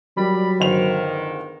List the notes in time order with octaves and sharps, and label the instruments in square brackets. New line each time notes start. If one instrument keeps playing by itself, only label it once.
[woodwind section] A#2 D5 B5 [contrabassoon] F#3 [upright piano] G3
[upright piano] G1 C5 F7 [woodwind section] G#2 D#3